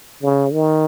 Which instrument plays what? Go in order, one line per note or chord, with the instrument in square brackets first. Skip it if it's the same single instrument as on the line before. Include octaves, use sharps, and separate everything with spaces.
[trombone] C#3
D#3